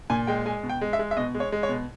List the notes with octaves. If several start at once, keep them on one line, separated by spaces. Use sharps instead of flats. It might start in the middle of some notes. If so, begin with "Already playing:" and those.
A#2 G#5
G#3 G5
G#3 G#5
B2
G5
G#3
E5
G#3
E5
B2 D#5
G#3
C#5
G#3
C#5
B2